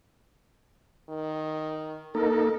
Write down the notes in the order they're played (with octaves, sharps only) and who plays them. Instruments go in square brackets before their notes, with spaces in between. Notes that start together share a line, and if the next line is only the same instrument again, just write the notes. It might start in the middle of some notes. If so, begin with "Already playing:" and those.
[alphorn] D#3
[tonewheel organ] A#3 D#4 A#4 [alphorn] A4